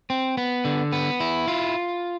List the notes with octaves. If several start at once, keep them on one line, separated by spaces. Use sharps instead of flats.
C4
B3
D3
B3
E4
F4